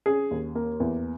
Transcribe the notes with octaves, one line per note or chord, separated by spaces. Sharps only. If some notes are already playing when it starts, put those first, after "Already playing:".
C#4 G#4
D#2
A#3
E2